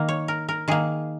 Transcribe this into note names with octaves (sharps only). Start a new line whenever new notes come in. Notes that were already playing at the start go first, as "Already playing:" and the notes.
Already playing: D#3 A#3
C#5
A#4
A#4
D#3 A#3 G#4